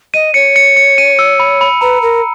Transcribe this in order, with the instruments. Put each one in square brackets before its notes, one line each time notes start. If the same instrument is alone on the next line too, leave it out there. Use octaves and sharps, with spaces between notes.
[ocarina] D#5 [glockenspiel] D#7
[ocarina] C#5 [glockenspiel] C#7
[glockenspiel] C#7
C#7
D#7
E6
B5
B5
[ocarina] B4 [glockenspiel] A#5
[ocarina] A#4